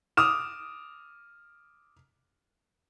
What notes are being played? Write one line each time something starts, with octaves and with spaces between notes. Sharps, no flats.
D6 D#6 F6 E7